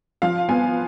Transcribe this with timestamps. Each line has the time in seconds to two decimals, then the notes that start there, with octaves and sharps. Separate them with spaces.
0.22 F3 F5
0.49 B3 G#5